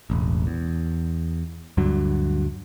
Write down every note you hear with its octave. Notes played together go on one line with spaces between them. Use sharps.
E1 A1
E2
D2 G2 D3 F#3